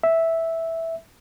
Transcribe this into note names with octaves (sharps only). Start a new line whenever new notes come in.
E5